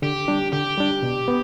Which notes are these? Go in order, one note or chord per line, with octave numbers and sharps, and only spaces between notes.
D3 G4
G3 D4
D3 G4
G3 D4
B2
B3